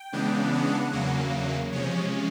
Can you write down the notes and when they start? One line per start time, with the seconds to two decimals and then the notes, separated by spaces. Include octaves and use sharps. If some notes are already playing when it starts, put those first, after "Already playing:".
Already playing: G5
0.12 C#3 E3 G#3 B3 D4
0.53 F#5
0.93 E2 C#3 F#3 A#3
1.72 C3 F3 G#3 C#4 C#5